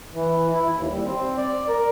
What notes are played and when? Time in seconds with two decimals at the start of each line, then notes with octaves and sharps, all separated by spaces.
0.14 E3
0.54 E4
0.76 D#2
0.89 G3
1.05 C4
1.37 D5
1.69 A#4